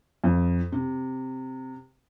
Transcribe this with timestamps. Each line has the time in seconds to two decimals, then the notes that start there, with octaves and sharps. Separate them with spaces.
0.24 F2
0.72 C3